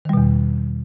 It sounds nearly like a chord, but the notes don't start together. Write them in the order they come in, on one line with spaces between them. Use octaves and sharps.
D#3 G3 B2 E2